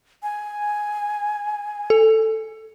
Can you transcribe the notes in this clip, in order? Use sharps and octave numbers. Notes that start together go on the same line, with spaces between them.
G#5
A4